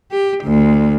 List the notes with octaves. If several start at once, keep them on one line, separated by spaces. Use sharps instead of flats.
G4
D2